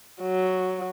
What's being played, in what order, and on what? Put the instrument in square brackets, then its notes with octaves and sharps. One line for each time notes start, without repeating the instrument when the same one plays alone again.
[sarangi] F#3